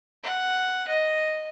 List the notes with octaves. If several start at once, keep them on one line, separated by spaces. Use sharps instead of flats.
F#5
D#5